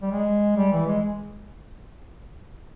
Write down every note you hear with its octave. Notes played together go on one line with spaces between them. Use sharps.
G3
G#3
G3
E3
G#3